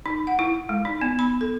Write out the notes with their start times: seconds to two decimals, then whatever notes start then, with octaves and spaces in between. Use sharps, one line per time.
0.06 D#4
0.27 F#5
0.39 E4
0.69 G#3
0.85 D#4
1.01 B3
1.19 B5
1.41 A4